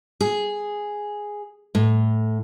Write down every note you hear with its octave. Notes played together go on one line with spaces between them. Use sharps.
G#4
A2